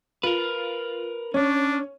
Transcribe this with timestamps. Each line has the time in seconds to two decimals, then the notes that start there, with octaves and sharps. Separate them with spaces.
0.23 F4 A#4 B4
1.34 C#4 D4 C#5